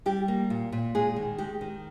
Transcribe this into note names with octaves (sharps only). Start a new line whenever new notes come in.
G3 G4
A#3
A#2
A#2
G#3 G#4
D#3
G#3 G4
D#3